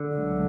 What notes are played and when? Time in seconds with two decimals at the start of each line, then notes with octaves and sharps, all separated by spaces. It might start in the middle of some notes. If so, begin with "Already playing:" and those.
Already playing: D3
0.14 C#2 B2 F#3 A3